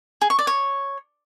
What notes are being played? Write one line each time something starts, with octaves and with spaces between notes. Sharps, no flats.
G#4
C#6
D5
C#5